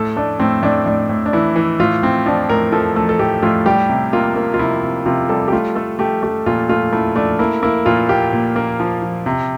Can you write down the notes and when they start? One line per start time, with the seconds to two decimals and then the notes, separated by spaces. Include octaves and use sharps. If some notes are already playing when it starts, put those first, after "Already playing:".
Already playing: A2 A4
0.16 A3 D4
0.39 A2 C4
0.62 A2 D4
0.86 A2 D4
1.09 A2
1.26 D4
1.33 E3 E4
1.56 E3
1.79 A2 F4
2.03 A2 C4
2.26 F3 D4
2.49 A2 A#4
2.72 F3 A4
2.96 A3 A4
3.09 A4
3.19 A2 G4
3.43 A2 F4
3.66 G3 G4
3.89 C3
4.13 A#3 F4
4.36 A#3
4.54 F4
4.59 C3 E4
4.83 C3
5.06 C3 F4
5.29 G3 A4
5.48 G4
5.52 A3 F4
5.75 A3 A4
5.99 A3 G4
6.23 A3 G4
6.46 A#2 F4
6.69 A3 F4
6.93 A3 E4
7.16 A3 D4
7.39 A#3 E4
7.63 A#3 E4
7.86 A#2 F4
8.09 A#3 G4
8.33 A#2
8.56 A#3
8.80 F3
9.02 F3
9.26 C3